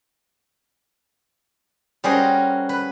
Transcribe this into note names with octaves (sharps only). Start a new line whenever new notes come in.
G3 C#4 F#4 G#4 A#4 C5
B4